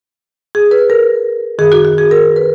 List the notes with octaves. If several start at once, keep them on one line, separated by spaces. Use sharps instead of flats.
G#4
B4
A#4
F#2 D#3 G#4
F#4
F#4
G#4
A#4
B4